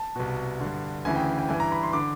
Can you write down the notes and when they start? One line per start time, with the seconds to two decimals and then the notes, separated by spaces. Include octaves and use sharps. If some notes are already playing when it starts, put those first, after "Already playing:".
Already playing: A5
0.16 C2 B2
0.61 G2 D3
1.05 D2 C#3 E3 G#5
1.16 G5
1.39 G5
1.49 G2 E3 G#5
1.60 A#5
1.72 B5
1.83 C6
1.93 D3 D6